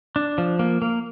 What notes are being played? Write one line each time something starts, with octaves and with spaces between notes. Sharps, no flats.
D4
F3
A#3
A#3